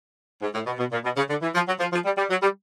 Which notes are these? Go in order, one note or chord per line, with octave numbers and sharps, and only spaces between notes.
G#2
A2
B2
B2
A#2
B2
C#3
D3
E3
F3
F#3
F3
F3
G3
G3
F#3
G3